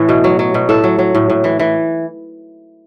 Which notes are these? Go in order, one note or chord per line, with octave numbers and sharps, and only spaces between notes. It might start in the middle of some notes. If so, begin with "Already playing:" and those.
Already playing: A2 E3
B2
F#3
F#3
B2
A2 A4
F#3
F#3
A2
A2
E3
E3